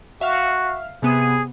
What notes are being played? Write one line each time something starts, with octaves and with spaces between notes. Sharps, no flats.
F#4 E5 F5 F6
C3 B3 G#4 D#7